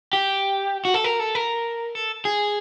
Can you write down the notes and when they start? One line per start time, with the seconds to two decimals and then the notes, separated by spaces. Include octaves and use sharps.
0.13 G4
0.85 F#4
0.94 A4
1.04 A#4
1.20 A4
1.35 A#4
1.95 A4
2.25 G#4